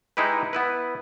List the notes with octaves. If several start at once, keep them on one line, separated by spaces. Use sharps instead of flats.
G#3 D#4 E4 G4 B4
B3 E4 B4